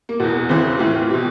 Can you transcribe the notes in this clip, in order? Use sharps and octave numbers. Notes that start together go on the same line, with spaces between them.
A#3
E2 B2 B3
E2 C#3 E3 C4
A2 E3 F4
B2 G4